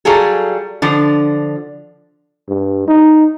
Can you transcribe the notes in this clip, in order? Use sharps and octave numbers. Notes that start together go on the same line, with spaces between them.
F#3 G3 F4 G#4 A4
D3 F3
G2
D#4